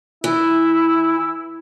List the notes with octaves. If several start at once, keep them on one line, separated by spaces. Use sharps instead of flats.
E3 E4